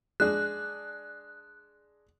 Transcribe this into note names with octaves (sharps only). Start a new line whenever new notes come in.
G#3 D4 G#4 F#6